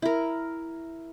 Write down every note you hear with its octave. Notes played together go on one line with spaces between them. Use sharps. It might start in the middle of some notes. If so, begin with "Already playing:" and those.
E4 A#4